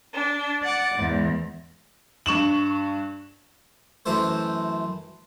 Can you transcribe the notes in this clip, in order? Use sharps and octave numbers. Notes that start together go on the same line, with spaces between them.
D4
D5 F#5 D6
E2 G#2
G2 C#6 E7 F#7
F#2 E3 A3 A4 C5